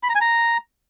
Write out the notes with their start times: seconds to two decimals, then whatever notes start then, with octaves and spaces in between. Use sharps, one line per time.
0.03 B5
0.09 A#5
0.15 G#5
0.21 A#5